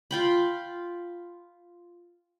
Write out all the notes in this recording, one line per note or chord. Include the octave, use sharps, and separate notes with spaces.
F4 G5 B5